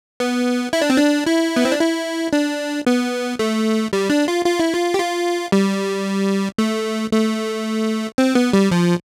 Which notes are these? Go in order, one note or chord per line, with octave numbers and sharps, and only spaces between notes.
B3
E4
D4
C4
D4
E4
B3
C4
D4
E4
D4
B3
A3
G3
D4
F4
F4
E4
F4
G4
F4
G3
A3
A3
C4
B3
G3
F3